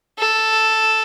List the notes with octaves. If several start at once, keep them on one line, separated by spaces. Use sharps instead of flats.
A4